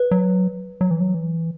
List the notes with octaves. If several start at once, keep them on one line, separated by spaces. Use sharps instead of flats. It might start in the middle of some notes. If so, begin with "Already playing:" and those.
Already playing: B4
F#3
F#3
E3
F#3
E3